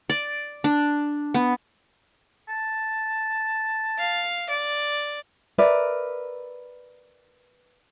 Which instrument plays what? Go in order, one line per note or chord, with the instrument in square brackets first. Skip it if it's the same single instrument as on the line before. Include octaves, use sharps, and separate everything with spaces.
[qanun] D5
D4
B3
[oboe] A5
[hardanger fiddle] F5
D5
[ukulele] A#4 B4 D5 E5